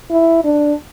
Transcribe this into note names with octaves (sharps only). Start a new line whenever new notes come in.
E4
D4